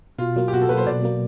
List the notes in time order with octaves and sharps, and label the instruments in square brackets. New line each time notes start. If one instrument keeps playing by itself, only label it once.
[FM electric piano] B2 [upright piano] F4
[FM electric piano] F#3 A#3
[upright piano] G4
[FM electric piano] B2 [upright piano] F#4
[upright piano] A4
[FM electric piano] F#3 A#3 [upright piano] B4
[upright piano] C5
[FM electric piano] B2 [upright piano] D5
[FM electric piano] F#3 A#3